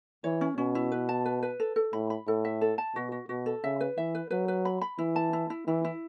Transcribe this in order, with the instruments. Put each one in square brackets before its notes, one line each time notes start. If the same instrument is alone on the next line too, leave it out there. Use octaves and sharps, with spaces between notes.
[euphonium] E3 [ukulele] C#5
[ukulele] C#4
[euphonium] B2 [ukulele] C#4
[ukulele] E4
B4
A5
B4
B4
A4
A4
[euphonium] A2 [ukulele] B5
[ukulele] B5
[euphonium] A2 [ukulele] A4
[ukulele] E5
A4
A5
[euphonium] B2 [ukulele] F#4
[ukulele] F#4
[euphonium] B2 [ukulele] F#4
[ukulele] A4
[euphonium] C#3 [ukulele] E5
[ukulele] B4
[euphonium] E3 [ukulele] E5
[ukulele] B4
[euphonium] F#3 [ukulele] B4
[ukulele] B4
B5
B5
[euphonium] E3 [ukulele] E4
[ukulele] A5
E4
E4
[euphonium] E3 [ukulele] E4
[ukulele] E4